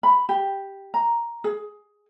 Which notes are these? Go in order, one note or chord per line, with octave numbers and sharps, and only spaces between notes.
B5
G4
A#5
G#4